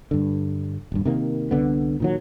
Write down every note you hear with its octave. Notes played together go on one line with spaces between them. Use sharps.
G2 D3
D#1 G2
C3 D#3 A#3
C2 D3 B3
A#2 D#3 F#3